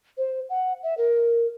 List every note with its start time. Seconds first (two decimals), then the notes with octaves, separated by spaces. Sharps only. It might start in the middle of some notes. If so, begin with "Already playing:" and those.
0.18 C5
0.50 F#5
0.83 E5
0.98 A#4